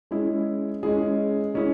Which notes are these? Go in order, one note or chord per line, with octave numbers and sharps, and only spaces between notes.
G#3 C#4 E4 G#4
G#3 C#4 E4 G#4
G#3 C#4 E4 G#4